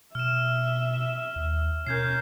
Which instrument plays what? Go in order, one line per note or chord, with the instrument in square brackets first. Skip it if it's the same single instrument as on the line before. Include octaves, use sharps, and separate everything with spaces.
[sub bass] B2 [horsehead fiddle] E5 [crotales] F6 E7
[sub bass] D#2
[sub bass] B2 [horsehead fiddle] C#4 A#4 [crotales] G6 G#6 C7